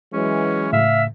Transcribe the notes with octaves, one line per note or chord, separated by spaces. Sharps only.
E3 F#3 G#3 C#4
A2 C#3 E5 F5